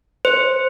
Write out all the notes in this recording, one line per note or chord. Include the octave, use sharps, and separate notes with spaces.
C5